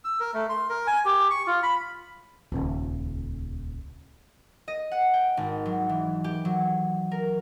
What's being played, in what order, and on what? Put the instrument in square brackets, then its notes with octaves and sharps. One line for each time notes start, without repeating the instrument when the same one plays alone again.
[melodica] E6
A#4
A3
C6
A#4
G#5
G4
C#6
F4
B5
[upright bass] D#1 C#2
[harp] D#5
F#5
G5
G#1
F#3
E3
G4
F#3
A#4